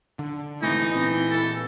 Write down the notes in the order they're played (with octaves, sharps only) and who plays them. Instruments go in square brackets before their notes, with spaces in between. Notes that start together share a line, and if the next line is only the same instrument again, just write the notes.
[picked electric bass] D3
[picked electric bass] G#2 C3 A3 [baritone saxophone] E3 [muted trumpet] D#4
[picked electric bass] A#2 C4
[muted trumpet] A4